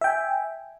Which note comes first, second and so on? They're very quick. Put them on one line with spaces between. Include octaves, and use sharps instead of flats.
E5 G5 G#5